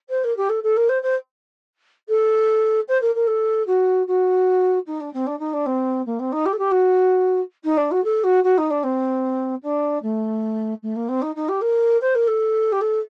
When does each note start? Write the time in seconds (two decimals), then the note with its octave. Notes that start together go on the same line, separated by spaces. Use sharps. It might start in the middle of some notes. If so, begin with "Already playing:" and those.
0.09 C5
0.24 A#4
0.37 G4
0.49 A4
0.63 A4
0.76 A#4
0.89 C5
1.02 C5
2.08 A4
2.88 C5
3.01 A#4
3.15 A#4
3.27 A4
3.67 F#4
4.07 F#4
4.86 D#4
5.00 D4
5.13 C4
5.26 D4
5.39 D#4
5.53 D4
5.66 C4
6.06 A#3
6.19 C4
6.32 D#4
6.45 G4
6.53 A4
6.58 G4
6.71 F#4
7.64 D#4
7.77 D4
7.91 F#4
8.04 A4
8.23 F#4
8.43 F#4
8.57 D#4
8.70 D4
8.83 C4
9.62 D4
10.02 A3
10.82 A3
10.95 A#3
11.08 C4
11.21 D#4
11.35 D#4
11.48 G4
11.61 A#4
12.01 C5
12.14 A#4
12.27 A4
12.72 G4
12.81 A4